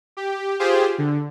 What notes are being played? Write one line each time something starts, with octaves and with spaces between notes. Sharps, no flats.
G4
F4 G4 G#4 C5
D3